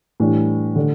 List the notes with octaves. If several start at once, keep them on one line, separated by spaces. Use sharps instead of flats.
A2 E3 G3 D4
D3 A3 D4